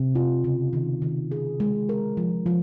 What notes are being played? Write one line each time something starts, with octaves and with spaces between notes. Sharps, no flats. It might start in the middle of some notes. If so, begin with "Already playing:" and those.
Already playing: C3
F4
C#3
D#3
D#3
G#4
G#3
A#4
F3
F3